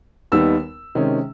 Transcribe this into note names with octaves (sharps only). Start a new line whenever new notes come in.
D#2 D#3 G3 B3 D#4 E6
C3 D#3 G#3 C#4